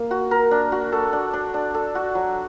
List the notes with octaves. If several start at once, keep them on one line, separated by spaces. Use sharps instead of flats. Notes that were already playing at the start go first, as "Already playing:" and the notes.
Already playing: A#3
F#4
A#4
D4
F#4
A4
D4
D4
D4
A4
F#4
F#3